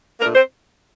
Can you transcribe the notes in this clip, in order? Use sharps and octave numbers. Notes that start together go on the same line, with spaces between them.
A#2 A3 A#3 D4 A#4
C4 C5